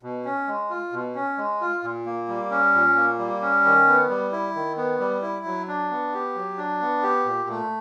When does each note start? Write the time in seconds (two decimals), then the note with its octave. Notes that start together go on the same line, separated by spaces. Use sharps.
0.03 B2
0.25 C#4
0.48 G#3
0.70 F4
0.92 B2
1.15 C#4
1.38 G#3
1.61 F4
1.84 A#2
2.06 A#3
2.28 G3
2.51 C#4
2.74 A#2
2.96 A#3
3.19 G3
3.42 C#4
3.65 D#3
3.87 B3
4.09 G3
4.32 E4
4.55 D#3
4.77 B3
5.00 G3
5.22 E4
5.45 F#3
5.68 D4
5.91 B3
6.14 G4
6.35 F#3
6.58 D4
6.81 B3
7.03 G4
7.25 A#2
7.49 A3